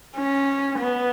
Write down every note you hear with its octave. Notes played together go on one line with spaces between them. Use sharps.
C#4
B3